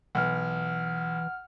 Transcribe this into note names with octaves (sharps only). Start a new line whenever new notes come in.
B1 E3 F#5 F6